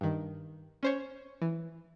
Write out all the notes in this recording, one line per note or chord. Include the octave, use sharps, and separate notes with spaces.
G2 D#3
C#4 C5 C#5
E3